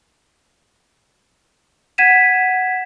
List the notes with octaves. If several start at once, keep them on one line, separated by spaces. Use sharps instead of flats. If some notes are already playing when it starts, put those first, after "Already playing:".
F#5 G#6 B6 D#7 E7